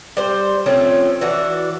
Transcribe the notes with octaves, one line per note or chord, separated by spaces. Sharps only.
G3 C5
F3 A3 C4 C#4
E3 D4 F#4